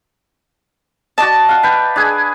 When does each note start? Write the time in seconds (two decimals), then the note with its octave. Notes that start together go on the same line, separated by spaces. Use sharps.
1.18 F#4 D5 D#5 A5
1.49 F5 F#5
1.63 B4 G5
1.96 D4 G#4 G#5